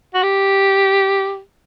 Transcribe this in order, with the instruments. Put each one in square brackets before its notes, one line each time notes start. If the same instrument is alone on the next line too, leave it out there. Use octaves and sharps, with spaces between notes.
[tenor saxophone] F#4
G4